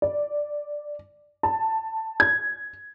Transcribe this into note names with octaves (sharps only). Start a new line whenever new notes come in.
D5
A5
G#6